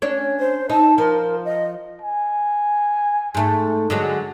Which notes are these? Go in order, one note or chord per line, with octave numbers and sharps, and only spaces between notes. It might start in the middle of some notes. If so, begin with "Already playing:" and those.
C#4 D4
C5
D#4 A5
F3 A#4
D#5
G#5
G#2 A3
D3 F#3 G#3